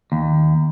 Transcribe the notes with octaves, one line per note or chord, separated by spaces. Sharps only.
D#2